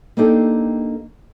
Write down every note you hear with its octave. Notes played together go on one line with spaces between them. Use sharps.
A#3 C4 D4 D#4 G4 A4